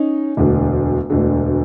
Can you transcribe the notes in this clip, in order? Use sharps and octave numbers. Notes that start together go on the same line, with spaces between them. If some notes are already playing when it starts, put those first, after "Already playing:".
Already playing: C#4 D#4
E1 D2 D3
E1 D2 D3